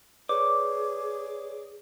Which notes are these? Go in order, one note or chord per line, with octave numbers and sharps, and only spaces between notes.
G#4 B4 C#5 D5 D6